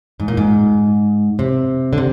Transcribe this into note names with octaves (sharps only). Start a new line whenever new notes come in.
G#2
A#2
G#2
C3
D3
C3